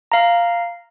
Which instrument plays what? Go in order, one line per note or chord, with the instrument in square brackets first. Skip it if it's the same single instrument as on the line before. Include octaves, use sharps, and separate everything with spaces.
[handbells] F5 A#5